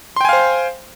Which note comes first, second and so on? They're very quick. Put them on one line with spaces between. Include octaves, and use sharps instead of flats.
C6 G5 G#5 F5 C5